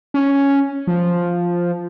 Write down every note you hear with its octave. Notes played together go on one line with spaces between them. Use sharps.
C#4
F3